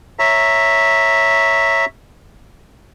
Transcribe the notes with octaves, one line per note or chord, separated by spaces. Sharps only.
C#5 E5 A#5